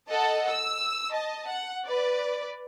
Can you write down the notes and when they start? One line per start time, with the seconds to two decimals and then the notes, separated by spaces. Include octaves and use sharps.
0.10 A4 D#5 F#5 A5
0.50 E6
1.11 D#5 A5
1.49 F#5
1.85 B4 D5